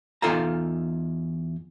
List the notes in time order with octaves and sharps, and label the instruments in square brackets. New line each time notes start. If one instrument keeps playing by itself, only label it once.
[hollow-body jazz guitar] E2 D#4 F4 A4 F5 A#5